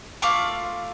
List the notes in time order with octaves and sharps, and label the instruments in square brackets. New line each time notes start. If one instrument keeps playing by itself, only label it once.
[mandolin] A3 F4 F5 D6